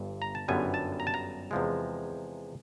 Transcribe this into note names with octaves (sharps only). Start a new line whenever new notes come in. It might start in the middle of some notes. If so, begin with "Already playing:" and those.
Already playing: G1 G2
A#5
A5
G1 F#2 D3 G3 B3 G#5
A5
A#5
A5
A#5
E2 C3 F3 G#3